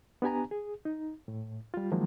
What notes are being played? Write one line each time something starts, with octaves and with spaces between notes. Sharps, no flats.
B3 D4 G4 G#5 A#5
G#4
D#4
A2
G3 F4
D#3 F3 F#3 G#3 A#3